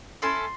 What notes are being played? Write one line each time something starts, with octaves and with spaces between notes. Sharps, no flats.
C#4 E4 A4 C6